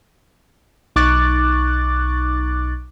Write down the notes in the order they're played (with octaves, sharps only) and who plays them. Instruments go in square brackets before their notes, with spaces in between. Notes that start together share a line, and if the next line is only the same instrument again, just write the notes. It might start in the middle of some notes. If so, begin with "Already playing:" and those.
[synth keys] B1 D#4 C#6 D6 F#6 A6